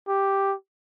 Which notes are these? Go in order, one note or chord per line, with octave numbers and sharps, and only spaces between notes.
G4